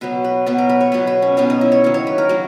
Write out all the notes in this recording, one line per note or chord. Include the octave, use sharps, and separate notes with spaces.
B2 F#3 B3 B4
B4
B2 F#3 B3 B4
A#4
B4
C#5
B2 F#3 B3 B4
B4
C#4
B2 F#3 B3 C#4
D#4
E4
C#5
D#3 F#3 A#3
C#5
B4
A#4
D#3 F#3 A#3